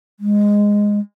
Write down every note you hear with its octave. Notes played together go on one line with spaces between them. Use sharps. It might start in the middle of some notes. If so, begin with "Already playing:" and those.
G#3